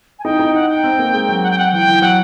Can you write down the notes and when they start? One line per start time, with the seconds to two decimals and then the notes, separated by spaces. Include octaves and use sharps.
0.19 G#5
0.24 D#4 G5
0.39 D#4
0.54 F#5
0.69 G5
0.84 C4
0.99 A#3
1.13 G#3
1.29 F#3
1.43 F#5
1.51 G5
1.58 F#5
1.72 E3 G5
1.88 E3
2.02 F#3 F#5